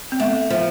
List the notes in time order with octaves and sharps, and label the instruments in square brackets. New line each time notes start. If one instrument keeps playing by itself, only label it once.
[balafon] C4
[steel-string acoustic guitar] A3 [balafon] B3
[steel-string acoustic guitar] F3